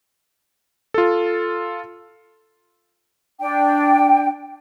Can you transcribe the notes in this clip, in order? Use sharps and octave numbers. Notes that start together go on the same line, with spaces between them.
F4 A4
D4 G5